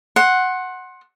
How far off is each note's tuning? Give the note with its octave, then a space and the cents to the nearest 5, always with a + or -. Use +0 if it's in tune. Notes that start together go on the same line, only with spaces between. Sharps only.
F#5 +0 C6 +25